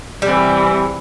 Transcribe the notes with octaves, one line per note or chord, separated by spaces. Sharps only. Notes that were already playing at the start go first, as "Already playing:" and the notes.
C3 E3 G3